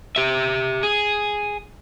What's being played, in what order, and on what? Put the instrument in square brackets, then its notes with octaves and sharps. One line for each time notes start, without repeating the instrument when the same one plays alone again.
[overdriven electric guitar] G4 E5
G#4